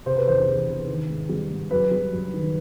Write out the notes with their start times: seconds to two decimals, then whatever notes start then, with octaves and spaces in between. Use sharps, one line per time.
0.06 C3 C5
0.16 B4
0.27 E2 C5
0.47 E2
0.68 C3
0.88 D#3
1.10 G#2
1.29 G3
1.51 G#2
1.71 F#2 B4
1.91 G3
2.12 F#2
2.33 D#3